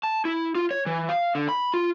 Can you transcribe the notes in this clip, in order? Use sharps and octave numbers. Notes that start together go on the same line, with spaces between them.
A5
E4
F4
C#5
E3
F5
D3
B5
F4